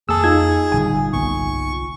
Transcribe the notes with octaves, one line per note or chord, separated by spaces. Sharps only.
F2 A#3 G#4 A5 E6
D#4 F4 G#6
G1 G2 A#2 G#5
C2 A#3 B3 C#6